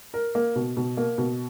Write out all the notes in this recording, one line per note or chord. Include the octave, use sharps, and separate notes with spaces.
A#4
A#3
B2
B2
A#3
B2